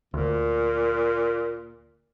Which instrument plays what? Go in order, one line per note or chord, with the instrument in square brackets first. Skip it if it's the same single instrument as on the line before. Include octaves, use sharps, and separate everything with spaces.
[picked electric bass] D2 [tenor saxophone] A#2